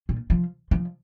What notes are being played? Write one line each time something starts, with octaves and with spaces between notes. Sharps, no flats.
A#2
F3
F3